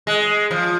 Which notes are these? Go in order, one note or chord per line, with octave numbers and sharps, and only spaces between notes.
G#3
F3